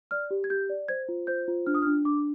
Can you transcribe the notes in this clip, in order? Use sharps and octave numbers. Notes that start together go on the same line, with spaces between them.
D5 F6
G4
G#6
G4 G6
D5
C5 G#6
F4
C5 G6
F4
D4 F6
D#6
F6
D4
D4 D6